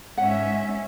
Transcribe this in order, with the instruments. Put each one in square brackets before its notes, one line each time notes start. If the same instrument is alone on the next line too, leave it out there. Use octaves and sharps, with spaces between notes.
[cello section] G#2 C#4 E5 [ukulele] F#5